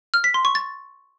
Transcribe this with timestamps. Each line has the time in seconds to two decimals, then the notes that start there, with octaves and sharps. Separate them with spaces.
0.14 F6
0.24 B6
0.34 C6
0.45 C#6
0.55 A6